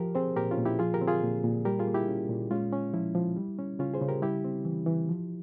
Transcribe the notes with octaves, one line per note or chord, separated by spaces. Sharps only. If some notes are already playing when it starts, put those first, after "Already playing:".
Already playing: F3 G4 A#4
C4 G#4 C5
A#2 G4 A#4
C#4 F4
A#2
E4 G4
F3 F4 G#4
G4 A#4
C4
F4 G#4
A#2
A#2
G3 G4 A#4
F4 G#4
A#3
E4 G4
C#4
A#2
G#3 C#4 F4
C#4
F3 E4
F3
G3
C#4
C#3 C#4 F4
G#4 C5
C#3
G4 A#4
G3 E4 G4
C4
E3
E3
F3